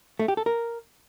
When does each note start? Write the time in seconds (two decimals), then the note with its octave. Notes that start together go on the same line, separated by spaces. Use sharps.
0.19 A3
0.28 G4
0.37 A4
0.46 A#4